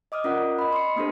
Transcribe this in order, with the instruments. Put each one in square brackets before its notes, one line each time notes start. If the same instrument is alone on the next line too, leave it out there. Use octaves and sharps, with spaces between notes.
[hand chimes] D#5 D6 D#6 F6
C#4 F4 A#4 D5 F#5
D#5 B5
C6 C#7
A#3 B3 D4 G4 A4 C5